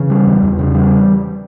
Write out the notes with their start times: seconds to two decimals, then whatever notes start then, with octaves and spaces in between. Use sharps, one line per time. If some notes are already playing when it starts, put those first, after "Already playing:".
Already playing: C#3 E3
0.10 G3
0.27 E2
0.43 E2
0.59 C#3
0.74 E3 G3